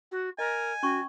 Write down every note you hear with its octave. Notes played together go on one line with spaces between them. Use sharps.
F#4
A#4 D#5 G#5
C#4 F#4 C#6